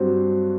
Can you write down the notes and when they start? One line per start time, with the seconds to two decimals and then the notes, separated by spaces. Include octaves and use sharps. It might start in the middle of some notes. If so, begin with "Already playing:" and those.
Already playing: G2 F#3 C4 F#4 C5